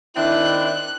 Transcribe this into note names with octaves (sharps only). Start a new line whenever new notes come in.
D#3 C4 D4 E4 F#6